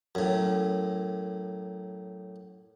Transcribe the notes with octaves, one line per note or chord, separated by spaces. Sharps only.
F#2 A2